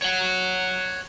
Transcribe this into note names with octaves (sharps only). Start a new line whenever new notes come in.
C#5 F#5